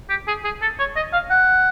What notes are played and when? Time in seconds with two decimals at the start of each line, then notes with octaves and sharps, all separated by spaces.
0.09 G4
0.28 G#4
0.44 G#4
0.62 A4
0.79 C#5
0.96 D#5
1.13 F5
1.30 F#5